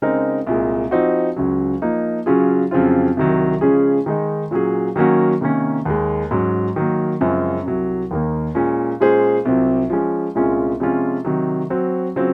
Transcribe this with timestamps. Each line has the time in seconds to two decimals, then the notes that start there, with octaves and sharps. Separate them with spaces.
0.02 C#3 G#3 C4 D#4 A#4
0.47 C2 A#2 G#3
0.91 F3 C4 D#4 F#4
1.36 C#2 C#3 F#3
1.82 F3 A#3 D#4
2.26 C#3 F#3 C#4 F4 G#4
2.71 F2 C#3 F#3 C4 F4
3.17 C2 C3 D#3 F#3
3.61 C#3 F3 G#3 C#4 G#4
4.06 D#3 G#3 D#4
4.51 A#2 F#3 C#4 G#4
4.96 D#3 F#3 A#3 C#4 F#4
5.41 C3 D#3 A#3 C#4
5.85 D#2 D#3 G#3
6.31 G#2 F#3 C#4
6.76 D#3 F#3 A#3
7.20 F#2 C#3 F3 G#3 C4
7.65 C2 C3 F#3
8.11 D#2 D#3 A#3
8.55 A#2 G#3 C#4
9.00 A#2 G#3 C#4 G#4 C5
9.45 C2 C3 F#3 C4 F4
9.90 F3 G#3 C#4
10.35 C2 A#2 G#3 C#4 F4
10.80 C3 F3 G#3 C#4 F4
11.25 C3 D#3 F#3
11.70 F#3 C4 F#4
12.16 C#3 F#3 C4 F4